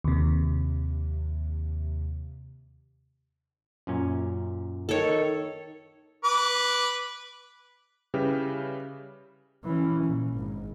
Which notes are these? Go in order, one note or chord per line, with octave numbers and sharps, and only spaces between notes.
D#2 C3
F#2 A#2 C#4
D#3 A4 C#5
B4 D6
C#3 G3 E4 G4 B4
E3 C#4
A#2
G#1 G#2